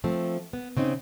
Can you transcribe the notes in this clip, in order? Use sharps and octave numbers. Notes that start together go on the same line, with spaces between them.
F3 A3 C4
B3
C#3 C4 D#4